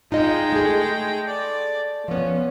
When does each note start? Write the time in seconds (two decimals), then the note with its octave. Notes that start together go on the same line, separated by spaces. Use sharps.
0.12 G#3 D#4 F4 D#5 G5
0.52 A3 G#4
1.27 D5
2.08 F3 B3 C#4